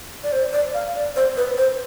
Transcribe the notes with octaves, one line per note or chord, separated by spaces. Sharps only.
D5
C5
D5
F5
D5
C5
B4
C5